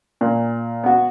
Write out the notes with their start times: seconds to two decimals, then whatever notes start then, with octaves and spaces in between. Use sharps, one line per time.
0.21 A#2
0.84 B3 F#4